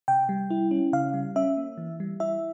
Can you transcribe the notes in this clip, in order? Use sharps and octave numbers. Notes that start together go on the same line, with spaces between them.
C3 G5
G3
E4
C#4
C#3 F5
G3
C#4 E5
A#3
E3
G3
E4 E5